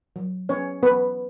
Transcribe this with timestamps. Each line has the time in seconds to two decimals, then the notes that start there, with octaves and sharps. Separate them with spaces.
0.16 F#3
0.49 B3 C#4 C#5
0.83 F#3 B3 B4